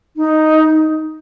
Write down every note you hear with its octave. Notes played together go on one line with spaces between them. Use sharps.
D#4